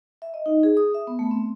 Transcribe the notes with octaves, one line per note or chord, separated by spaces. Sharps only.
E5
D#5
D#4
G#4
D#6
E5
B3
A3
C4